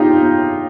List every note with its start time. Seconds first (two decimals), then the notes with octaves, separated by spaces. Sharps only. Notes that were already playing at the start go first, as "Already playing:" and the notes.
Already playing: D#4 F4 G4